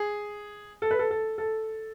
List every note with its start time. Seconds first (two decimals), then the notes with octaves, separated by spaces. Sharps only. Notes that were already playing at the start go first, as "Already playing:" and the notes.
Already playing: G#4
0.82 A4
0.91 B4
0.99 A4
1.11 A4
1.38 A4